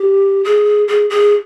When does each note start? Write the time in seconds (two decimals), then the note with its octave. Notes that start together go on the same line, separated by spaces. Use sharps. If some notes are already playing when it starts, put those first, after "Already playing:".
Already playing: G4
0.45 G#4
0.88 G#4
1.10 G#4